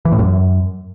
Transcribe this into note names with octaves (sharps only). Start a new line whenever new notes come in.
E3
A2
F#2